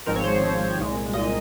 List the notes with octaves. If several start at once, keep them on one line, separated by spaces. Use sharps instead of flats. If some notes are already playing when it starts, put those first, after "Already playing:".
G#1 G#2 F3 C4 A#4
C#5
C5
G#1 G#2 F3 C4
C2 A#2 G#3
C2 A#2 G#3 D#5